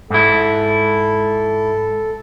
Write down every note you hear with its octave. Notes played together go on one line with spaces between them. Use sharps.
G#2 E4 A4